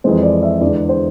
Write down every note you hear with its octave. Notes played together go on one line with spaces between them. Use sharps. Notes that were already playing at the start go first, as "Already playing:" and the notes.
F2 E3 G#3 C5
D5
E5
E2 D3 G#3 D5
C5